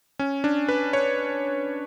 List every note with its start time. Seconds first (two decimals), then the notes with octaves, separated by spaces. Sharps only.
0.19 C#4
0.44 D4
0.69 B4
0.93 C#5